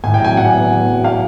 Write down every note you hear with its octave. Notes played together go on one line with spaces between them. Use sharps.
A2 G#5
G5
F#3 G#5
A2 F#5
B3
A2
F#3
B3 F5